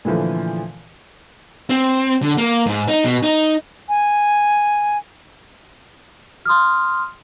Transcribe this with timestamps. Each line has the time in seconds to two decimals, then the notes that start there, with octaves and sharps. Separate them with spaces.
0.05 A#2 D3 E3 F3 A3
1.70 C4
2.22 D3
2.38 A#3
2.66 G#2
2.88 D#4
3.04 B2
3.23 D#4
3.89 G#5
6.45 C6 D#6 F6